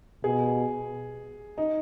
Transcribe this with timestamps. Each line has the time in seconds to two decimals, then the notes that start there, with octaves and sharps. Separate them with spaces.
0.24 B2 G#4
1.58 D#4